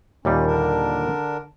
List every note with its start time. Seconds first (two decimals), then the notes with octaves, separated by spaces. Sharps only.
0.25 D#2 A#2 G3 C#4
0.47 D3 D4 A#4